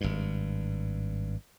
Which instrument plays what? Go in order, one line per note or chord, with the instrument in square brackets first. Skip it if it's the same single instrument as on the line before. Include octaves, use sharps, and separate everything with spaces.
[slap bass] G#1 G2